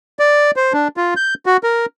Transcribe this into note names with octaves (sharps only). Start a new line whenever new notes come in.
D5
C5
D4
F4
G6
F#4
A#4